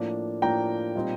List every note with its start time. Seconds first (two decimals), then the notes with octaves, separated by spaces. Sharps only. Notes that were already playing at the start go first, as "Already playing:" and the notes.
Already playing: A2 F3 A#3 D4
0.42 A2 F3 A#3 D4 G5 A#5
0.96 A#2 G3 C4 D#4